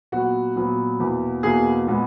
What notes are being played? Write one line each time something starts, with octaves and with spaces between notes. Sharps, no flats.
A#2 F#3 B3 F#4
A#2 F#3 B3
E2 B2 A#3
E2 B2 A#3 G#4
A#2 G#3 B3